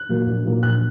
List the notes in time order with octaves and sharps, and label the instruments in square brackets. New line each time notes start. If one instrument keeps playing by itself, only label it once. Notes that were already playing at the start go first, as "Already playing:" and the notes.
Already playing: [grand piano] F#6
A#2 F#3 A#3
A#1
A#2 F#3 A#3
A#1 F#6